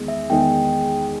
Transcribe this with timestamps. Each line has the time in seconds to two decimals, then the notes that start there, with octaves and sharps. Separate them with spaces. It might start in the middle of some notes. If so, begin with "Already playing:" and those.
Already playing: E2 D#3 G#3 D#4 G#4
0.08 E5
0.29 E2 D#3 G#3 D#4 G#4 G5